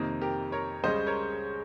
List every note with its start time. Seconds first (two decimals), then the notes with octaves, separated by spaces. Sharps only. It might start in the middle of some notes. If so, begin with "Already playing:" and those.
Already playing: F2 C3 D#3 A#3 D#4
0.21 G4 A#4
0.52 A#4 C#5
0.84 C#2 C#3 G3 C#4 C5 D#5
1.07 A#4 C#5